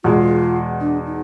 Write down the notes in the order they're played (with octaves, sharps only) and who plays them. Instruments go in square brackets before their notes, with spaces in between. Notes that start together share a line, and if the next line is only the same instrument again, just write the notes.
[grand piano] E2 B2 G#3 [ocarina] F4
[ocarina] D4
D#4